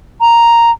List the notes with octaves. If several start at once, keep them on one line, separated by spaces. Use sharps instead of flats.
A#5